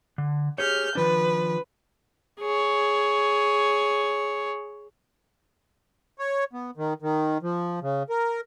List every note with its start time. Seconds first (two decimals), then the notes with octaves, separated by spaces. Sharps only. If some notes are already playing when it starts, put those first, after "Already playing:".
0.18 D3
0.58 G4 G#4 C#5 F6 G6
0.95 D#3 F3 D4 B4
2.41 G#4 C#5
6.19 C#5
6.53 B3
6.77 D#3
7.02 D#3
7.42 F3
7.82 C#3
8.10 A#4